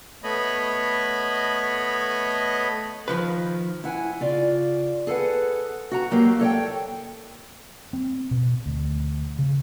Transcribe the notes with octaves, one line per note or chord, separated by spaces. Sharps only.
A3 B3 C#5 D#5 B5
D#3 F3 B4
E4 F#5 G#5
C#3 F4 D5
G#4 A4 B4 F#5
F#4 F#5 A#5
F#3 G#3 A#3 G4
A4 C#5 F5 G5
C4
B2
D2
C#3